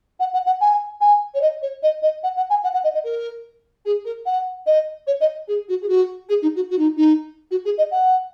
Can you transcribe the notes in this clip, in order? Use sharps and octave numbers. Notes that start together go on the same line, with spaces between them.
F#5
F#5
F#5
G#5
G#5
C#5
D#5
C#5
D#5
D#5
F#5
F#5
G#5
F#5
F#5
D#5
D#5
A#4
G#4
A#4
F#5
D#5
C#5
D#5
G#4
F#4
G#4
F#4
G#4
D#4
F#4
F#4
D#4
D#4
F#4
G#4
D#5
F#5